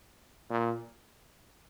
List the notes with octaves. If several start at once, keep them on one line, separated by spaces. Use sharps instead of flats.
A#2